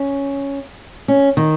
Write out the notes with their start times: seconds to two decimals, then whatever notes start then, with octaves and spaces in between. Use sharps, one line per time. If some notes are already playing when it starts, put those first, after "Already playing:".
Already playing: C#4
1.08 C#4
1.37 D#3